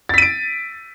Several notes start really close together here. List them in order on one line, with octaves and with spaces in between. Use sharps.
A6 B6 D#7 D7